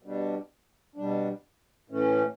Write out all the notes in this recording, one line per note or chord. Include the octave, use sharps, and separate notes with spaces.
B2 G3 D4
B2 G3 D4
A2 E3 A3 C#4